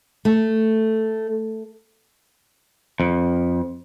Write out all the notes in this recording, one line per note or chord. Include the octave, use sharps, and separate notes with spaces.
A3
F2